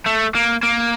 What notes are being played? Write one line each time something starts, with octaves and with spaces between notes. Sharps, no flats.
A3
A#3
A#3